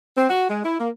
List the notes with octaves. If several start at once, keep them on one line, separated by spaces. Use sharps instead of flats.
C4
F#4
G#3
E4
A#3